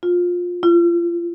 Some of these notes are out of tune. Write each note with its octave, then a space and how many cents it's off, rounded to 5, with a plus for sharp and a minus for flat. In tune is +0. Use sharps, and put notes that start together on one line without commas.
F4 +20
F4 -30